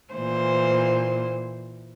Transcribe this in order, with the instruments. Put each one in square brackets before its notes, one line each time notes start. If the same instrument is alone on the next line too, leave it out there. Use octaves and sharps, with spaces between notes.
[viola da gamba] A#2 E3 C5